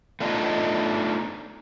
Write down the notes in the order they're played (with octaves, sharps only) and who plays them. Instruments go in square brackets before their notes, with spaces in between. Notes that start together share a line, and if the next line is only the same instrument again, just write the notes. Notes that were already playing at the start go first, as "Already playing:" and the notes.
[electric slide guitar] A3 B3 D4 D#4 F4 D#5